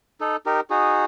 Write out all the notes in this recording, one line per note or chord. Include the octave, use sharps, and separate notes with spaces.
D#4 A4
D#4 G4 A#4
D#4 F#4 G#4